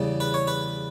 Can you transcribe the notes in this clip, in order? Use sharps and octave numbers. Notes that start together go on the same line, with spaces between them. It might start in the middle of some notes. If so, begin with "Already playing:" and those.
Already playing: E2 C#3 G3
B4
C#5
B4